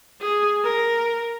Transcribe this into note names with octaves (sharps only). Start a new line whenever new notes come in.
G#4
A#4